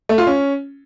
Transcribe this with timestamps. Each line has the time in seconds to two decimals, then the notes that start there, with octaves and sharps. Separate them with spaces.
0.09 A3
0.18 F4
0.27 C#4